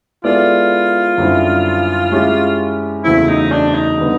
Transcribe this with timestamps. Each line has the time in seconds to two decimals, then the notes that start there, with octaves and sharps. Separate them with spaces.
0.24 G#3 B3 E4 F4 A4 D5
1.18 F#2 D3 G3 C4 E4
2.11 G#3 C#4 E4 G4
3.04 E2 C#3 F#3 A3 C4 E4
3.28 D#4
3.52 D4
3.75 D#4
3.98 D3 G3 B3